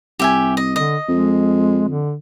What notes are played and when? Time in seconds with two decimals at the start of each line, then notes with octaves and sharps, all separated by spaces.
0.19 C2 G4 E5 G#5
0.57 D#5
0.76 D3 D#5
1.08 F2 G#3
1.88 D3